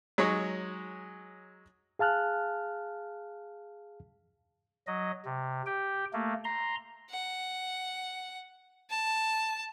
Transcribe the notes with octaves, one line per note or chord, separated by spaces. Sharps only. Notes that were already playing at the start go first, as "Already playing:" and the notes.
F#3 G#3 D#4 C#5
G#4 F5 A5 F6 F#6
F#3 D#5
C3
G4 G5
A3 A#3
A#5 C6
F#5
A5